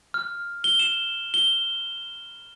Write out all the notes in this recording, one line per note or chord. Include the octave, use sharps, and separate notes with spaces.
F6
G7
E7
G7